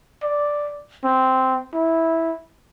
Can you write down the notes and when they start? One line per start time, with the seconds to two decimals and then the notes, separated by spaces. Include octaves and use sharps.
0.23 D5
1.04 C4
1.74 E4